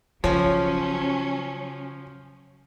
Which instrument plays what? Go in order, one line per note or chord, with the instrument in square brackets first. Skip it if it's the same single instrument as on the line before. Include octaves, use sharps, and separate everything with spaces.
[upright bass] C#3 [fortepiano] F3 [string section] F#3 C#4 [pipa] G#3 C#5